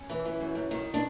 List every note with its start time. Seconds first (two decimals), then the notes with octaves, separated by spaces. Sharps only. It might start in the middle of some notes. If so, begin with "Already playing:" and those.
Already playing: C#4
0.10 E3
0.25 E3
0.40 F#2
0.55 F#2
0.71 D#3
0.94 D4